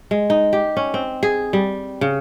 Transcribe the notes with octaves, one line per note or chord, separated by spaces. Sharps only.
G#3
D#4
G4
C#4
C4
G#4
G3
C#3